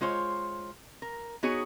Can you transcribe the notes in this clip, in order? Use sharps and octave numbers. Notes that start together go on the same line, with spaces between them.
G#3 F4 C5 C#5
A#4
B3 D#4 F#4 G#4 C#5